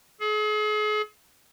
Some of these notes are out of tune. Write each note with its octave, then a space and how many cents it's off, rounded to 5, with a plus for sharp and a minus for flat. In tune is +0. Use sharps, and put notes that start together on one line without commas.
G#4 +40